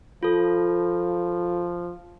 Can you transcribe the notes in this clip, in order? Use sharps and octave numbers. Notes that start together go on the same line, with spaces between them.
F3 F4 A4